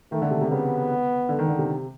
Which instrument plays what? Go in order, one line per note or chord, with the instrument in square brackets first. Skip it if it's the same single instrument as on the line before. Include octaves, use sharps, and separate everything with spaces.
[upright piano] D#3 [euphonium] A3
[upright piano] D3
C3
C3
[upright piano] C#3 [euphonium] B3
[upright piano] D3
D#3
D3
C3